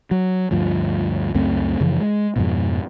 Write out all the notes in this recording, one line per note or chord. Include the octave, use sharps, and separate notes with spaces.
F#3
D2 G2 F3
C#2 F#2 A3 C4
F#2 C#3 E3 F3
G#3
F2 G#2 B2